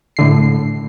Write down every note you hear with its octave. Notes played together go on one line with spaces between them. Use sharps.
A2 D3 C7